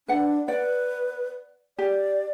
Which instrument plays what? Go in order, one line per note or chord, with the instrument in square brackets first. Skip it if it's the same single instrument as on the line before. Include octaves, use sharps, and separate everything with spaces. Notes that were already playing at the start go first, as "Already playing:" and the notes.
[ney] D4 [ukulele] B4 F#5
[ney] B4 [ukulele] D5 F#5
[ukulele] G4 [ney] D5